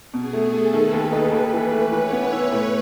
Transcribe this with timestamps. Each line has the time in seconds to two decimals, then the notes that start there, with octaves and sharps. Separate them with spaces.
0.14 B2 G#4
0.33 A3
0.43 A4
0.53 A3
0.73 D#3 B4
0.93 D#2
1.13 D#4
1.32 D#2
1.53 E3
1.72 A3
1.92 E3 C#5
2.12 B3
2.23 C#5
2.32 E4
2.52 A2